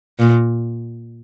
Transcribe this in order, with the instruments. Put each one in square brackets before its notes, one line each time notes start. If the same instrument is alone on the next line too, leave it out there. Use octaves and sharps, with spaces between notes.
[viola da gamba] A#2